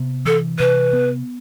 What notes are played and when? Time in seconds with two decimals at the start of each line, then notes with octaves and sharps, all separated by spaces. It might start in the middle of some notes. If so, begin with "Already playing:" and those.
Already playing: C3 B3
0.25 E3 A4
0.59 C3 B4
0.93 B3